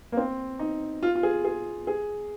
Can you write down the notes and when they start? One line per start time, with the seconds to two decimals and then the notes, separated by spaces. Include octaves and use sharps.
0.12 A#3
0.17 C4
0.59 D#4
1.03 F4
1.15 F4
1.23 G#4
1.44 G#4
1.87 G#4